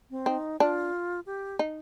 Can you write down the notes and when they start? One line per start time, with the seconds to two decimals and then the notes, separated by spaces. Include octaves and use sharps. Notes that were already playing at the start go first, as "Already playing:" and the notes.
0.10 C4
0.26 C4 D#4
0.60 D4 F4
1.26 G4
1.59 D#4